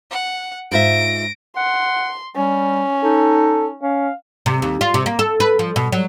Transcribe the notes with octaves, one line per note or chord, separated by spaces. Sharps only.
F#5
G#2 F4 E5 A#6 D7
F#5 C6
G3 C#4
D#4 A4
C#4 F5
C3
D#2
F4
C3
A#3
A4
B4
F3
B2
F#3